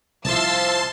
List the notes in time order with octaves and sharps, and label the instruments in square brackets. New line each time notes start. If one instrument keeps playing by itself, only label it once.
[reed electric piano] C2 [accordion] F3 [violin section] E5 E6 A6 [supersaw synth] A5 C6